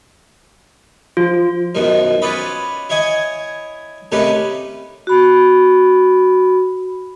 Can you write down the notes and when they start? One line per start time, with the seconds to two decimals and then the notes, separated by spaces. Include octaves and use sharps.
1.17 F3 F4
1.75 F#2 B2 D#3 F3
2.22 C#4 F4 B4 D5 D#5 B5
2.90 E4 C#5 D#5 G#5
4.12 C3 D#3 A3 C#4 G4 B4
5.07 F#4 B5